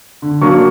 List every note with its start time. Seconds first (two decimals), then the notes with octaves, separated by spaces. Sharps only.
0.22 D3
0.41 F#3 A#3 D4 C#6